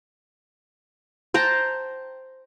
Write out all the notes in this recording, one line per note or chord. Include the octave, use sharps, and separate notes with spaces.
C5 G5 A5 A#5